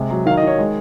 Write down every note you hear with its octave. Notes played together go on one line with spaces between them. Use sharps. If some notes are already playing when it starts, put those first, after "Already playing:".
Already playing: C3 G#3
F#3
D#3 F5
D#5
D#3 C#5
G#3